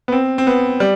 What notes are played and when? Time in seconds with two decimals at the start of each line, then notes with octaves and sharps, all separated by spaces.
0.08 B3
0.12 C4
0.38 C4
0.47 B3
0.80 G3